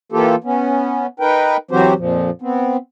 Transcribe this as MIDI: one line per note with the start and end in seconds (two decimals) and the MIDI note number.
0.12 0.35 52
0.12 0.35 58
0.12 0.35 65
0.12 0.35 67
0.12 0.35 69
0.44 1.07 59
0.44 1.07 61
1.20 1.57 63
1.20 1.57 70
1.20 1.57 71
1.20 1.57 79
1.71 1.94 52
1.71 1.94 54
1.71 1.94 60
1.71 1.94 66
1.71 1.94 67
1.71 1.94 72
1.97 2.30 41
1.97 2.30 46
1.97 2.30 53
2.42 2.77 59
2.42 2.77 60